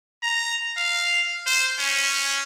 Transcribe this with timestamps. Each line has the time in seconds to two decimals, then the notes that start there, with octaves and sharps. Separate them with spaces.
0.23 A#5
0.77 F5
1.46 C5
1.79 C#4